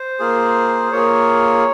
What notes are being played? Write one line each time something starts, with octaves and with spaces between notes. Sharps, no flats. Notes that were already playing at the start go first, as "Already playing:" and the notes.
Already playing: C5
A#3 F4 G#4
A#3 F4 G#4 C#5